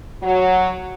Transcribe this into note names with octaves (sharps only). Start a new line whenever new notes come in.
F#3